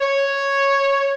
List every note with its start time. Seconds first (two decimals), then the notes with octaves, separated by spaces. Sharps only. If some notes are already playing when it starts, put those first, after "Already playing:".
0.01 C#5